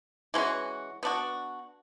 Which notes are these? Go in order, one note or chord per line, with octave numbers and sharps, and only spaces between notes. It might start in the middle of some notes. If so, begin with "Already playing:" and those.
E3 G#3 C#4 F#4
B3 D4 F#4